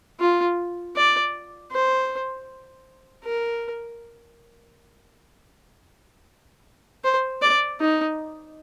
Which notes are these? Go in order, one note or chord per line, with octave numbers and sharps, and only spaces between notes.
F4
D5
C5
A#4
C5
D5
D#4